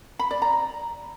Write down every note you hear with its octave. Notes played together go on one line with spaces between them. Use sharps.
B5
D5
A#5